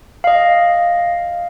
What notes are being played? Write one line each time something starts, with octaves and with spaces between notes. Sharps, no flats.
D#5 F5